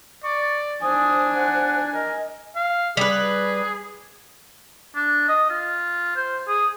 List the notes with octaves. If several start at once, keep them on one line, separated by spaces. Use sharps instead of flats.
D5 C#6
D4 C5 G#5 D#6
F#5
A#4 D#5
F5
G3 G#4 B4
D4
D#5
F4
C5
G#4